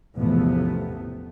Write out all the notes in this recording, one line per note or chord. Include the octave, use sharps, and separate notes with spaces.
A1 E2 C3 F3 A3 B3